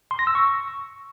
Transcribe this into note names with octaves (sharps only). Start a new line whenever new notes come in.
C6
A#6
E6
C#6